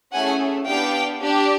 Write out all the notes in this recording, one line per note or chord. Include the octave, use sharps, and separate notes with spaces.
A3 C#4 E4 G#4 F#5 G#5
B3 D4 G4 F5 G5
D4 G4